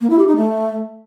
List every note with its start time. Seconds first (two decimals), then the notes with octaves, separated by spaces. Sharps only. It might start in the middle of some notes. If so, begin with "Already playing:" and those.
0.01 A#3
0.10 E4
0.19 G4
0.28 D#4
0.37 A3